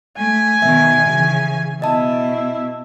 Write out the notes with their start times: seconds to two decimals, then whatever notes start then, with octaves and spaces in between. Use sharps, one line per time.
0.18 A3 G#5
0.62 B2 D#3 E5
1.08 C#3 E3
1.82 B2 E4 D#5 A5